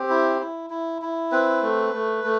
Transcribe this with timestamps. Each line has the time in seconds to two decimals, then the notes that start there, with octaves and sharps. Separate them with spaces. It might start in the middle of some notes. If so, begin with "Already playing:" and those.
Already playing: C4 G4
0.09 E4
0.40 E4
0.70 E4
1.02 E4
1.32 C4 B4
1.62 A3
1.93 A3
2.24 A3